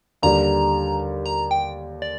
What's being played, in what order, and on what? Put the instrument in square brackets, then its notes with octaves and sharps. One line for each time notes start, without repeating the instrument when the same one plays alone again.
[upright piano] D#2 D3 G3 [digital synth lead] A#5
[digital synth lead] A#5
G5
D5